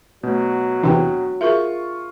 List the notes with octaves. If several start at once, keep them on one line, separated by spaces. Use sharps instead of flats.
B2 F#3 A3
E2 C3 E3 D4 D#4 G5
F4 G#4 A#4 E5 C#6